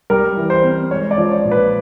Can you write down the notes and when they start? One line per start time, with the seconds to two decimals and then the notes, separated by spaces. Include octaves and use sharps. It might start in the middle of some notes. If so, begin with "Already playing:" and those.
0.10 G3 A#4
0.37 E3
0.50 C5
0.64 C4
0.91 G#3 C#5
1.11 D5
1.18 F3
1.31 C#5
1.45 A#2
1.52 B4